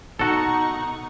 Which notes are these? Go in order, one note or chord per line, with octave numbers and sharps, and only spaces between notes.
B2 D#4 F#4 A4 F#5 A#5 C#6